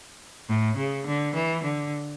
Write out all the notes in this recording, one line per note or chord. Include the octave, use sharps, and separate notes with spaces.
A2
C#3
D3
E3
D3